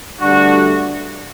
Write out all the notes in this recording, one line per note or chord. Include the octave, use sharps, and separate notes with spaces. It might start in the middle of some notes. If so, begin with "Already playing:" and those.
G2 D3 A3 D4 F#4